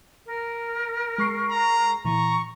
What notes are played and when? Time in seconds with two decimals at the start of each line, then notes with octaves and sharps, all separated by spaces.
0.26 A#4
1.18 G#3 C#6 C7
1.51 A#5
2.05 A#2 E3 A#5 C#6